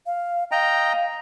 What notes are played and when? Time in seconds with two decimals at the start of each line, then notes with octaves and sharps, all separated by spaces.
0.06 F5
0.52 D#5 F5 G5 A#5